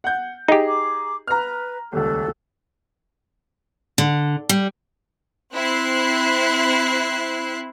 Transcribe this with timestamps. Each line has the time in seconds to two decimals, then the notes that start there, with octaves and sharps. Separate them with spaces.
0.04 F#5 G6
0.48 D#4 G4 G#4 A#5
0.67 D6
1.27 B4 A#5 F6
1.92 D#1 C#2 A4
3.98 D3
4.49 G3
5.53 C4 E4 F#6 C7